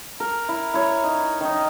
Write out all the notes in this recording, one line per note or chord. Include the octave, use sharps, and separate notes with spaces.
A#4
E4
E4 C#5
D#4
D#3 D#4